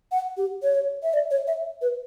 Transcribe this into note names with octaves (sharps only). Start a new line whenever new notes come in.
F#5
G4
C#5
E5
D5
C#5
E5
B4